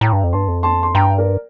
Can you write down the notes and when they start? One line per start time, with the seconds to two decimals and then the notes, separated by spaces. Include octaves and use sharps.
0.01 A2 G5 A#5
0.13 G2
0.24 F2
0.33 G2 A5 C6
0.48 F2
0.63 A5 C6
0.83 C6
0.95 G2 G5 A#5
1.18 A#4 D5